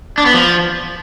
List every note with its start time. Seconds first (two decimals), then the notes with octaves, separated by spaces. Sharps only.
0.18 D4
0.26 B3
0.34 F3